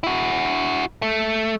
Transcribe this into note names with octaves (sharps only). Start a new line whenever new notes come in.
E4 F#4
A3